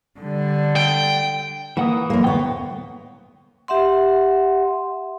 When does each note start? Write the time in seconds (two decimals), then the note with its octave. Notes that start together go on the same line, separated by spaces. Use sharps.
0.20 D3 G3
0.76 G5
1.77 E3 A#3 F#5 D#6
2.10 F#2 A#3
2.24 D2 B3 G5 C#6
3.68 G4 E5 F#5 C6